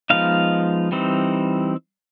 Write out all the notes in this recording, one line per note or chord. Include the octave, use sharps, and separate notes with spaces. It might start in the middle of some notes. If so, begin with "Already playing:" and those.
F3 G#3 B3 D#4 F5
E3 G3 C4 D#4